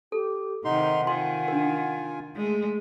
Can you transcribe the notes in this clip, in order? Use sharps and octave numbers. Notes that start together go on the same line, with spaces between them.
G4 A4
C3 D#3 D#4 F#5 C6
D#3 F4 G#5 C6
D4 A#4
G#3 A3